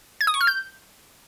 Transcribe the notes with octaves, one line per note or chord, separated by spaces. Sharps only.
G#6
D#6
C#6
F6
G6